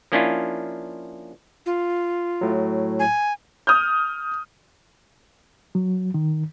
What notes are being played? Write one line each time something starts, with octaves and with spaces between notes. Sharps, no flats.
F3 A#3 C#4 D4 E4 F4
F4
A2 F#3
G#5
D#6 F6 G6
F#3
D#3